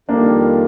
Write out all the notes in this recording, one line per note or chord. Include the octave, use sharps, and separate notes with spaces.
F2 D#3 G3 A#3 D4